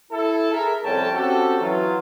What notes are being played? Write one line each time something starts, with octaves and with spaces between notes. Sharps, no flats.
E4 A4
G#4 A#4 E5
C2 F2 C#4 A4 G5 A5
C4 C#4 F#4 G4 A4
E3 F#3 F4